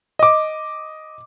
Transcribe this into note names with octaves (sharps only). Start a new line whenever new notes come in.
D#5 D6